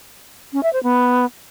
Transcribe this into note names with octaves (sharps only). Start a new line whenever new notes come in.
C#4
E5
C5
B3